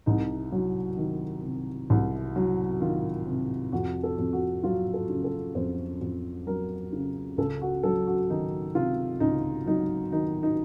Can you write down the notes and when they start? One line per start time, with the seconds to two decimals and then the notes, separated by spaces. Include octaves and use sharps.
0.06 C2 D#4
0.52 F#3
0.97 D#3
1.43 C3
1.90 C2
2.36 F#3
2.80 D#3 F4
3.27 C3
3.72 F2 F#4
4.03 A4
4.18 F2
4.33 F#4
4.64 F#3 F4
4.94 A4
5.09 C#3
5.24 A4
5.55 F2 C5
6.01 F2
6.47 F#3 A#4
6.93 C#3
7.38 C#2 A4
7.62 F#4
7.83 F#3 A4
8.07 F#4
8.30 D#3 D#4
8.75 C3 F4
9.20 C#2 D#4
9.66 F#3 D#4
10.12 D#3 D#4
10.43 D#4